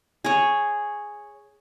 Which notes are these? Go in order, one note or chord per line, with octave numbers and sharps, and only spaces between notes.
G#4 C#5